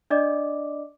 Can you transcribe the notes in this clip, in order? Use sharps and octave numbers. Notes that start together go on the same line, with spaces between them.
D4 D5 D#5 D6